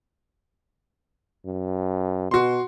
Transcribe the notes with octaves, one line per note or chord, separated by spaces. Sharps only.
F#2
B2 F#4 C6